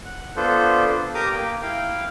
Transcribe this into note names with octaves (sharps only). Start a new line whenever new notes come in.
F#5
B3 D4 F4 A4 C5
G4 A#4 A#5 D6 D#6
A#3 G5
E4 F5 G5